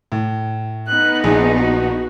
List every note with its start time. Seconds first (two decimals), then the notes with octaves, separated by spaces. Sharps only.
0.12 A2
0.88 B3 D#4 F#6
1.24 A#1 G#4
1.58 F#4